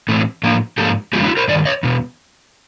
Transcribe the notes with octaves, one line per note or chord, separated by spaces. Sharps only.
A2 E3 A3 C4
A2 F3 A#3
G#2 F3 A#3 G4 A4
F#2 D3 F3 G#3 B3 F4 G4
E4 F#4
A#4 C5
G2 D#3 D5
C#5 D#5
E2 B2